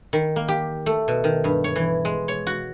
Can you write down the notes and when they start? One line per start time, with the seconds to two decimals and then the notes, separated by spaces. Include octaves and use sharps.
0.13 D#3
0.36 A#3
0.48 G4
0.86 A3
1.08 B2
1.24 D#3
1.44 G2
1.64 C#5
1.76 E3
2.05 G#3
2.28 C#5
2.47 F#4